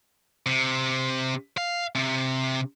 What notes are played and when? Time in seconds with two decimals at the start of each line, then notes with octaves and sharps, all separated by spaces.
0.46 C3
1.58 F5
1.95 C3